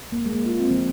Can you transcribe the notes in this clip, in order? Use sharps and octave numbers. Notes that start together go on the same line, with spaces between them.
A#3
G#3
F4
C4
F3